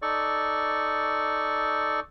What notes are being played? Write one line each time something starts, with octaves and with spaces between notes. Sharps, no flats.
D#4 A4 D5 C#6